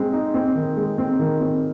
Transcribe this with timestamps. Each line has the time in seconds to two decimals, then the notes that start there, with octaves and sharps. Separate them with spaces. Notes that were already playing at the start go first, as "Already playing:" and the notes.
Already playing: G#3 C4
0.13 D#4
0.34 C4
0.55 D#3
0.77 G#3
0.98 C4
1.19 D#3
1.41 C4